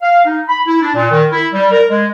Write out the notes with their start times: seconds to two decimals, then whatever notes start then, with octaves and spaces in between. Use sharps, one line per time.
0.02 F5
0.25 D#4
0.48 B5
0.66 E4
0.81 D4
0.95 A#2
1.10 D#3
1.32 E4
1.53 G3
1.72 A#4
1.89 G#3